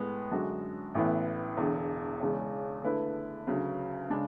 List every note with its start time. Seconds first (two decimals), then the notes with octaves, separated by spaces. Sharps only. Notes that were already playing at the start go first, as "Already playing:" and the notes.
Already playing: A2 G#3 B3
0.31 F#2 D3 G#3 D4 F#4
0.95 A1 A2 E3 B3
1.57 E1 E2 D3
2.20 E1 E2 C#3 G#3 C#4
2.84 D3 A3 E4 B4
3.47 D2 C#3 F#3
4.10 C#3 G#3 D4